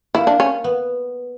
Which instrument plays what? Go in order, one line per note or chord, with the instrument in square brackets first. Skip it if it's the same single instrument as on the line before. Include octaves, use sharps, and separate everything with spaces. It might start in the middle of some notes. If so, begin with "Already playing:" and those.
[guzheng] A#3 [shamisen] E4
[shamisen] D4
C#4
[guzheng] B3